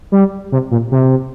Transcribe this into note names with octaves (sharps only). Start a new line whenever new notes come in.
G3
C3
A#2
C3